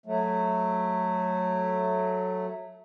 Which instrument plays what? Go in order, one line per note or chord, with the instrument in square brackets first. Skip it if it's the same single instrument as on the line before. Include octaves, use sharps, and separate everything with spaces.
[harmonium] F#3 A3